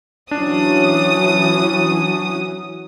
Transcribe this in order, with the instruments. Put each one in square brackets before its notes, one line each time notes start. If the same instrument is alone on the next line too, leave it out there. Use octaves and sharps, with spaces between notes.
[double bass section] E3 F#3 C#4 [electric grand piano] D4 [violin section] D#6